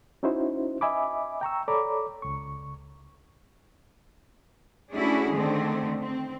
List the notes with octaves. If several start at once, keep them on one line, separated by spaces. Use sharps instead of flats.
C#4 D#4 E4 F#4 C5
D#5 E5 G#5 B5 D6
G5 A#5 C#6 E6
A4 C#5 D5 A#5 B5 D6
C#2 C#6
A3 C#4 D4 E4 F#4 G#4
D3 D#3 A3 C4 D4
C4